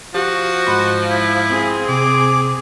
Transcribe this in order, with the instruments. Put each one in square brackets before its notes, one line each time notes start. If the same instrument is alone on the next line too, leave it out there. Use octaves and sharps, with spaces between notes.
[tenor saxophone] F3 [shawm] F#4 [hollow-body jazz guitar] G4
[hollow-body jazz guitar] G#2 B5 C6
[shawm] E4
[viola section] C4 G#4
[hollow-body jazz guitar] C3 [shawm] D6